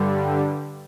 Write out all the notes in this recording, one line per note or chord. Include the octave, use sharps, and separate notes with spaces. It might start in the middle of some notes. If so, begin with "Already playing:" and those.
Already playing: G2 D3 G3